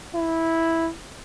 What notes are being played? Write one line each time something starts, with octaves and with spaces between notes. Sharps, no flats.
E4